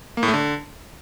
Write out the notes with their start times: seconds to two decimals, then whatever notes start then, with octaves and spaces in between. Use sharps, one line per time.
0.17 A#3
0.23 A2
0.28 A3
0.34 D3